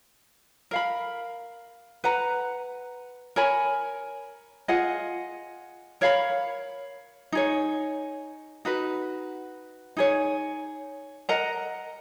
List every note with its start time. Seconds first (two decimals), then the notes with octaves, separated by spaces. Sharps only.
0.71 A#4 F5 B5
2.04 B4 F#5 A#5
3.36 A#4 C#5 G#5 B5
4.68 F4 G#4 D#5 F#5
6.01 A#4 C#5 F5 B5
7.32 D#4 G#4 C#5
8.65 D#4 F#4 B4
9.97 D#4 G#4 C#5
11.29 A#4 D#5 F#5 A#5